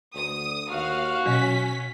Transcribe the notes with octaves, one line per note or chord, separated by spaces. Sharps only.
D2 D#6
D#2 F#4 F5
B2 F#3 C#4 B6